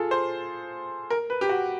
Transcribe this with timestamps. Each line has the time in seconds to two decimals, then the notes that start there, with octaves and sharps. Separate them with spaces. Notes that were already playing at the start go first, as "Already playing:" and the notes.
Already playing: F4 G#4 A4
0.11 C5
1.10 A#4
1.30 B4
1.41 G4
1.49 F#4